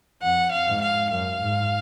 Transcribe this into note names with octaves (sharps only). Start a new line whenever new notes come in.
F2 F#5
F5
G#2
F5
F#2 F5
G#2